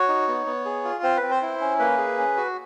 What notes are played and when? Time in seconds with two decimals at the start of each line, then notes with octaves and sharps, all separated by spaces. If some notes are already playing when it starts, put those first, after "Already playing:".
Already playing: F#4 C#5
0.08 D#4
0.28 B3
0.46 B3
0.65 G#4
0.85 F4
1.03 C4 C5
1.17 B4
1.22 C4
1.31 C5
1.42 E4
1.61 C#4
1.79 A#3 B4
1.98 G#4
2.18 C#4
2.37 F#4